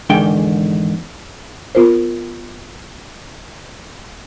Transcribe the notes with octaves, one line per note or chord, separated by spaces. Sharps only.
E2 G#2 D3 D#3 G5
B3 F4 A#4 C5